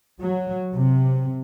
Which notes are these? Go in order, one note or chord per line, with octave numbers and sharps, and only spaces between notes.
F#3
C3